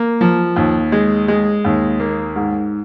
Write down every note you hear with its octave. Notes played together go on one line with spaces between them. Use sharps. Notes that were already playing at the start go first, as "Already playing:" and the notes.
Already playing: A#3
F3
D#2
G#3
G#3
D#2
A#3
G#2